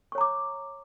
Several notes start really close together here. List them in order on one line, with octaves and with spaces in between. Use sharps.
C#6 C#5 A#5 D6